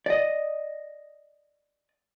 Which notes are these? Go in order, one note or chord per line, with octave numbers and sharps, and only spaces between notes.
D5 D#5